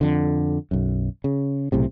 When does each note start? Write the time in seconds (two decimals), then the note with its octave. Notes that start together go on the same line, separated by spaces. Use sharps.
0.01 F2 D3
0.71 B1 F#2
1.24 C#3
1.72 B1 A2 C3